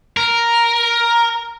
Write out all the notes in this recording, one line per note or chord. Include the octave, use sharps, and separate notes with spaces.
A#4